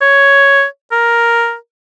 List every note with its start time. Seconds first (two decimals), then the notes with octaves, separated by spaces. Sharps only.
0.01 C#5
0.92 A#4